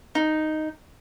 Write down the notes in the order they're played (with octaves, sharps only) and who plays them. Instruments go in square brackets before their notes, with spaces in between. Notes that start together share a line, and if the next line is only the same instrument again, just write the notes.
[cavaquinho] D#4